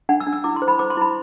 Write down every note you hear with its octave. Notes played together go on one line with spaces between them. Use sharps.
D4 F#5
E6
D4
E6
E4 D6
C6
C5
B5
C5 D6
C6
E4 B5